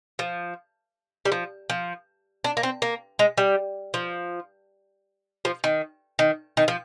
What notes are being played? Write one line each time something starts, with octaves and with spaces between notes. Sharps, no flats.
F3
G3
F3
F3
D4
A#3
C4
A#3
G#3
G3
F3
F3
D#3
D#3
D#3
F3